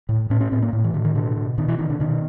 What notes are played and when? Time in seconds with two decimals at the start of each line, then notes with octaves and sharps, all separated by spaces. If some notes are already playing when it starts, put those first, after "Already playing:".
0.09 A2
0.30 A2 C#4
0.41 C#4
0.52 A2 C4
0.62 A#3
0.73 A2
0.84 E3
0.94 A2 D3
1.05 D#3
1.15 B2 D3
1.37 B2
1.58 B2 D#3
1.68 E3
1.79 B2 D#3
1.90 D3
2.00 B2 D#3